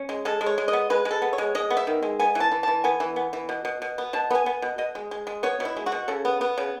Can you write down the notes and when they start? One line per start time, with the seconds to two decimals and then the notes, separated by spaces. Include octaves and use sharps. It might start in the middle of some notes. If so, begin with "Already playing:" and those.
Already playing: C#4
0.09 G#3
0.25 G#3 A4
0.41 G#3
0.46 C#5
0.58 G#3
0.68 D#5
0.73 B3
0.90 G#3 B4
1.05 G#3
1.11 A4
1.22 B3
1.33 C#5
1.38 G#3
1.55 G#3 D#5
1.70 B3
1.77 E5
1.87 D#3
2.03 G#3
2.20 B3 G#5
2.35 E3
2.40 A5
2.52 E3
2.63 E3 A5
2.84 B3 G#5
3.00 E3
3.16 B3
3.33 E3
3.49 B2
3.65 B2
3.82 B2
3.98 B3
4.13 B2 A5
4.31 B3 G#5
4.46 B3
4.62 B2
4.78 B2 D#5
4.95 G#3
5.11 G#3
5.27 G#3
5.43 B3 C#5
5.60 B2 E4
5.77 G#3
5.86 F#4
5.92 B2
6.08 C#3 A4
6.25 B3
6.41 B3
6.58 C#3